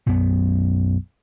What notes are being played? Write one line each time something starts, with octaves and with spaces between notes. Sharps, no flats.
B1 F#2 B3